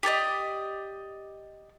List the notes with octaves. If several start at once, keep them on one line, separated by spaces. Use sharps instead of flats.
G4 A4 D5 D#5